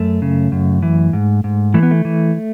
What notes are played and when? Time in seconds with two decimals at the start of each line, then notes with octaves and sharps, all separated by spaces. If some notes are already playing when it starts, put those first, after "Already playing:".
Already playing: F#2 A3
0.22 C#3
0.52 F#2
0.82 E3
1.13 G#2
1.44 G#2
1.74 E3 A3
1.83 B3
1.91 A3
2.05 E3